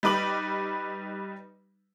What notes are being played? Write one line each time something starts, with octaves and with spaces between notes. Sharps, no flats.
G3 D#4 B4 D6 F#7